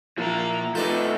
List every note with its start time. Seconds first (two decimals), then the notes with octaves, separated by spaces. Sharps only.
0.18 A#2 F3 A#3 E4
0.75 A3 D#4 F4 A4 B4 D5